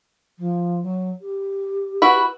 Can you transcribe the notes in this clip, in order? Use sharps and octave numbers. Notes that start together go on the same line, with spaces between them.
F3
F#3
G4
E4 F#4 B4